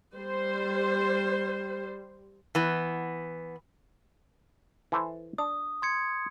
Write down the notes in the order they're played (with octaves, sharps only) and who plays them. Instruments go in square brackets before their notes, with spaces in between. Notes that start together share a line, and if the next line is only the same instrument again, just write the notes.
[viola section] G3 C5
[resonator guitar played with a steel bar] E3 B3
[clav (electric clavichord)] E3 A4 C5
[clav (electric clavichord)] D4 [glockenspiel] D#6
[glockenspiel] C6 G#6 C#7